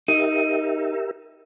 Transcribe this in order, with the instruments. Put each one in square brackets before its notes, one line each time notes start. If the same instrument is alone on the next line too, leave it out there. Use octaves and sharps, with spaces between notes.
[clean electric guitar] D#4 [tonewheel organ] G4 A#4 E5